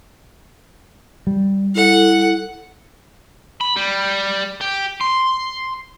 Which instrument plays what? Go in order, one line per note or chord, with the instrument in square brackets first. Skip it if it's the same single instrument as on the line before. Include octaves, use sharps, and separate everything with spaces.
[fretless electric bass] G3
[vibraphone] E4 A4 [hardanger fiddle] F#5
[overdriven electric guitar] B5
G3
G4
C6